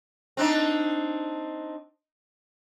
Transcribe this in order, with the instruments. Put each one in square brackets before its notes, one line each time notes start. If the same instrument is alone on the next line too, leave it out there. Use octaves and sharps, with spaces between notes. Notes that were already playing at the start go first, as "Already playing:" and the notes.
[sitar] C4 D4 D#4